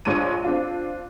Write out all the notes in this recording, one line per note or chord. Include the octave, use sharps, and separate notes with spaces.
A#1 G#3 D4 C#5 D#7
C4 D4 F4